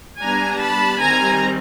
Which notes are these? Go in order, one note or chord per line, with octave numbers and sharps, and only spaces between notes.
G3 B3 D4 G#5 A#5
A5 B5
D#3 G3 C4 G#5 A#5